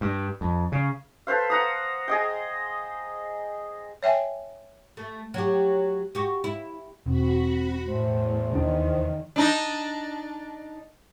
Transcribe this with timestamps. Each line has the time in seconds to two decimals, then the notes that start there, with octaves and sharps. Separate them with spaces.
0.01 G2
0.41 F2
0.72 C#3
1.27 A4 B4 C5 F5
1.50 F#5 A#5 D#6
2.08 G#4 D#5 G5
4.03 C#5 E5 G5 G#5
4.97 A3
5.34 F#3 G4
6.15 F#4 G4
6.44 E4
7.06 E1 C4 F#4 B5
7.87 E2 A2 C5
8.55 D#2 D#3 D4
9.36 D4 D#4 D#5